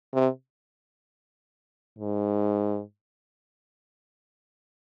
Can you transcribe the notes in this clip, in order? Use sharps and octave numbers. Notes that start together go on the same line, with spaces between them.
C3
G#2